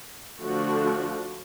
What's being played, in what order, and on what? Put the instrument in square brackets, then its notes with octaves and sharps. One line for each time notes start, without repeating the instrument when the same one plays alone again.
[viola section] D3 F3 A3 D4 F#4